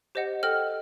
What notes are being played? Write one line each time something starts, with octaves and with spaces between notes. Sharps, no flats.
G4 C5 D#5 F#5
A4 C5 D#5 G5 F6